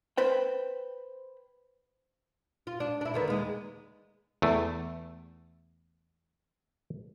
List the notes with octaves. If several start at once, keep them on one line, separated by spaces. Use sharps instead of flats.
B4 C5 G5
F4
D4
D4 E4
D3 D#3 B3
D#2 G#3
E2 A3